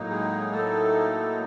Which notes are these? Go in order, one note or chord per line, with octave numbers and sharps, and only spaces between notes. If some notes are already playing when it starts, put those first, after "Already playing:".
Already playing: A2 F#3 A#3 D#4
G#3 G#4
A3 A4